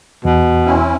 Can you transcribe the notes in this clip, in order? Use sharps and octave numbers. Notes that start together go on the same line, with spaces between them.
E2 B2
C4 C#4 E4